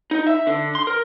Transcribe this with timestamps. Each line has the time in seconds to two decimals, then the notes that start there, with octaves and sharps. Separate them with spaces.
0.11 D#4
0.27 E5
0.47 D3
0.75 C6
0.87 A#4